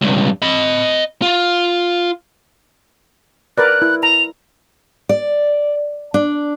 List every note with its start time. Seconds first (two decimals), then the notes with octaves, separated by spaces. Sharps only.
0.01 C#2 G2
0.42 D#5 B5
1.22 F4
3.58 A#4 B4 D5 F#6
3.82 E4
4.03 A#5 F7
5.09 D5
6.14 D4